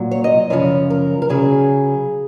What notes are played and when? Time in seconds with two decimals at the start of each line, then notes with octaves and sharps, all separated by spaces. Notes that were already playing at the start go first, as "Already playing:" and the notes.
Already playing: A#2 F#3
0.11 C#5
0.24 D#5
0.50 F#2 C#3 F3 C#5
0.90 A#4
1.22 A#4
1.29 C#3 F#3 G#4